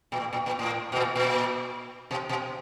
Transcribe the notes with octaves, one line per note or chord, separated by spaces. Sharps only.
A#2
A2
A#2
A#2
A2
B2
A#2
A#2
B2
B2